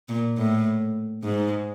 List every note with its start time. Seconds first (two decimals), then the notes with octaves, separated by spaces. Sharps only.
0.09 A#2
0.38 A2
1.23 G#2